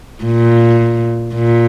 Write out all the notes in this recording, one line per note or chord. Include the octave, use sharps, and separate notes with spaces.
A#2
A#2